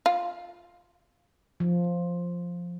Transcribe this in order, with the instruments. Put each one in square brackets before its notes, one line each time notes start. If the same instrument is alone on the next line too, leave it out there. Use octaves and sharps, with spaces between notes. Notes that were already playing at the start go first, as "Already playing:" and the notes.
[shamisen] F4
[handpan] F3